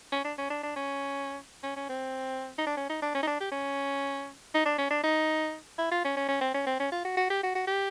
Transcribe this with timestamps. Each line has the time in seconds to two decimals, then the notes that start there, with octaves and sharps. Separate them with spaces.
0.12 C#4
0.25 D4
0.38 C#4
0.50 D4
0.63 D4
0.76 C#4
1.64 C#4
1.76 C#4
1.89 C4
2.58 D#4
2.67 D4
2.77 C#4
2.89 D#4
3.02 D4
3.15 C#4
3.23 D#4
3.27 D4
3.40 G4
3.52 C#4
4.54 D#4
4.66 D4
4.78 C#4
4.90 D4
5.04 D#4
5.79 E4
5.91 F4
6.05 C#4
6.17 C#4
6.29 C#4
6.41 C4
6.54 C#4
6.67 C4
6.80 C#4
6.92 F4
7.05 F#4
7.17 F#4
7.30 G4
7.43 F#4
7.55 F#4
7.67 G4